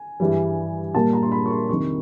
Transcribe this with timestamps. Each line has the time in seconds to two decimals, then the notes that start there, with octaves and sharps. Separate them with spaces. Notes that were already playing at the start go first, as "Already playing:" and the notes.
Already playing: G#5
0.20 G2 E3 G3
0.95 A#2 G3 A#3 A5
1.13 A#5
1.23 C6
1.32 B5
1.46 C#6
1.51 C6
1.69 F2 C3 D#3 C#6